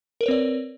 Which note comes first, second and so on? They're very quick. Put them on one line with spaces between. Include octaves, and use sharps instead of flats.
A#4 B4 C#5 C4 D5